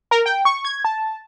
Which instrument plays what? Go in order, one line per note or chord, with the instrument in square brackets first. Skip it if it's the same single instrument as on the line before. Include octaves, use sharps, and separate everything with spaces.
[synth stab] A#4
G5
C#6
G#6
A5